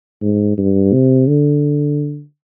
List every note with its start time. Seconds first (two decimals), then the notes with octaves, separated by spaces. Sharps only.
0.22 G#2
0.58 G2
0.93 C3
1.28 D3